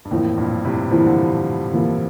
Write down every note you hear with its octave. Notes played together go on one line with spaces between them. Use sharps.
G2
F2 A2 E3 A#3 E4
G2 A#2
A2 C3
E3 F3 A#3 E4
G3
D3 F3
E3 A#3 E4